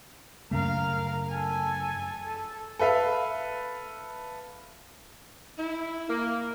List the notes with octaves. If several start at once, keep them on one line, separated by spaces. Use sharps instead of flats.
F#2 C#3 A3 A#4 F5
A4 G#5
A4
A4 B4 E5 F5
E4
A#3